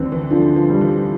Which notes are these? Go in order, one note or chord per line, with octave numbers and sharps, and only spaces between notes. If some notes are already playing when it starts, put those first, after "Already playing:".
Already playing: D2 D3 E3 C4
E3
D3 F3
F3
G3
E3